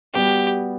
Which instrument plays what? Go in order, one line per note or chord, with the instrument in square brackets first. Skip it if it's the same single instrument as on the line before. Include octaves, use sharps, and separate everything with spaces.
[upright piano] G3 B3 F#4 [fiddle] G4